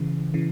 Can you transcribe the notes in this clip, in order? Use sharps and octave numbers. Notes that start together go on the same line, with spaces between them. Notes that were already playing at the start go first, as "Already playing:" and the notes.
Already playing: C#3 E3
C#3 E3